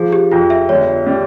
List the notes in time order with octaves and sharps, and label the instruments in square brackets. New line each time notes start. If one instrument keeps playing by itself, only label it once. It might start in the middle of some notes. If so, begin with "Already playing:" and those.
Already playing: [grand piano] F3 [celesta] G#4
[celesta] G4
[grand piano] F2 [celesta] F4
[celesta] E5
[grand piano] G1 [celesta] C#5
[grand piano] G3